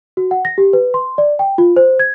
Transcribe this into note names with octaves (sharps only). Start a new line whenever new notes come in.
F#4
F#5
A#6
G4
B4
C6
D5
G5
F4
C5
G#6